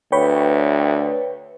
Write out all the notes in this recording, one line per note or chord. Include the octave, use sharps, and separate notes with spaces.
D2 B4 C#5 G5